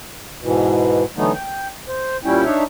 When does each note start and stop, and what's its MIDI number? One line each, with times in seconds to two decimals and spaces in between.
0.42 1.04 44
0.42 1.04 47
0.42 1.04 52
1.17 1.32 50
1.17 1.32 52
1.17 1.32 54
1.17 1.32 57
1.17 1.32 59
1.17 1.32 63
1.34 1.68 79
1.88 2.17 72
2.24 2.45 46
2.24 2.45 55
2.24 2.45 61
2.24 2.45 64
2.24 2.45 79
2.45 2.64 62
2.45 2.64 63
2.45 2.64 73
2.45 2.64 76